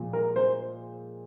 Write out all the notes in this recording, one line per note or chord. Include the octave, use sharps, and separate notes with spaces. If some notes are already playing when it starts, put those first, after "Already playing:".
Already playing: A#2 F3 G#3
A#4
C5